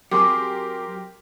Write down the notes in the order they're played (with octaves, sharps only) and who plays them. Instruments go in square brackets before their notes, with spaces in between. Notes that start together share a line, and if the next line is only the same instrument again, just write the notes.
[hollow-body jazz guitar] F#3 C4 G#4 [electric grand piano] G4 A#4 C6 [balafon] D6